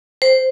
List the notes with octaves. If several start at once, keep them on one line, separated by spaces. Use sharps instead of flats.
C5